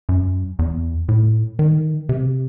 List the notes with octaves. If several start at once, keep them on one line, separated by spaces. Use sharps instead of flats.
F#2
E2
A2
D#3
C3